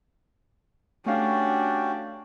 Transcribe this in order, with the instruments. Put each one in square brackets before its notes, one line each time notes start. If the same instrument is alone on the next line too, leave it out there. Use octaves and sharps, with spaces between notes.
[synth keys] A3 F5 [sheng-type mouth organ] C#4 F#4 G4 [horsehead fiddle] D4